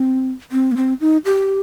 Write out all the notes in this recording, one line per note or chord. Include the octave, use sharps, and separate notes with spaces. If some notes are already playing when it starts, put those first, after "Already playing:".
Already playing: C4
C4
A#3
C4
D#4
G4